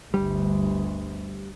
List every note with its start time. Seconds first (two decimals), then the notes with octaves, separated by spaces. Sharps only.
0.14 G1 D2 G3